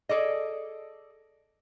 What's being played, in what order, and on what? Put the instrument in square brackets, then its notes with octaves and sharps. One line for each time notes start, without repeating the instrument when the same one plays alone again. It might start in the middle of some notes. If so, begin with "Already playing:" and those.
[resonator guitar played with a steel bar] G#4 A4 D5 D#5